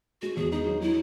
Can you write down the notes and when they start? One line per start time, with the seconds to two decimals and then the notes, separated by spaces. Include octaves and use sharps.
0.22 G#3 F#4
0.36 E2 G#4
0.52 D#4 G#4
0.66 F#3
0.81 F#3 E4